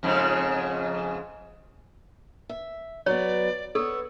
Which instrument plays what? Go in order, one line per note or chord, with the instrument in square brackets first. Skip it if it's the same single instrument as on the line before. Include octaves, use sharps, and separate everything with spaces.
[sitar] F2 G#2 C#3
[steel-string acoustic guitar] E5
[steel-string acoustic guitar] F#3 B3 [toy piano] C#5 [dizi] D5
[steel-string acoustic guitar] B3 C#5 [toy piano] A4 [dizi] E6